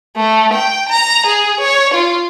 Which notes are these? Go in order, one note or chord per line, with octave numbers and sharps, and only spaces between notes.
A3
G5
A#5
G#4
C#5
F4